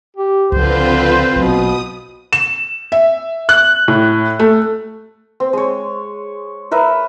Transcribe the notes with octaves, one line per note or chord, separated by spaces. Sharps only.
G4
C#2 D3 F3 C4 F4 B4 C5
A#1 B2 F#3 D#6
E7
E5
F#6
A2
A3
C4
G#3 C#5
A#4 B4 E5 A#5